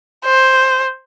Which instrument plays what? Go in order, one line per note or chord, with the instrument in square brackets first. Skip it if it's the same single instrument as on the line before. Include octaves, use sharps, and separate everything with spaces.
[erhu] C5